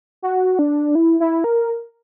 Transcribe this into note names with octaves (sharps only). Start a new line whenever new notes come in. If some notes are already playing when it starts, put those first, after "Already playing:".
F#4
D4
E4
E4
A#4